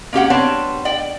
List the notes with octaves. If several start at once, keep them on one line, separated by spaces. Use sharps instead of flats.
A#3 C#4 G4 F#5
G3 B3 C4 D4 C#5 A5
D5 G5